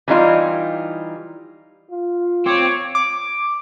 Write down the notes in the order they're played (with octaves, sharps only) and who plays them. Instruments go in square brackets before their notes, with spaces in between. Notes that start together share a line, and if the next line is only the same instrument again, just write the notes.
[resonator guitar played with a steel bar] E3 G3 D#4 F4
[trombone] F4
[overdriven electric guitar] C4 [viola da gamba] C#5 [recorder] D6
[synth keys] D6